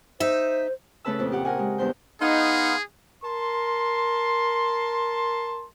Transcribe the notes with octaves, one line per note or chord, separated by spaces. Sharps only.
D#4 C5 E5
C#3 A3 C#4 B4 A5 E6
F2 A#2
G4 F#5
A#4 F#5 G#5
G#3
E2 G2 C5 G6
B3 D#4 G#4 F5 C6
A#4 A5 C6